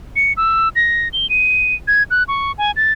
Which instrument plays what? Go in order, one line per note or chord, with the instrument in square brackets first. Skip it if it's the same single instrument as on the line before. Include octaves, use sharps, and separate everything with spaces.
[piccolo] C#7
E6
A#6
G7
D#7
G#6
F#6
C#6
G#5
A6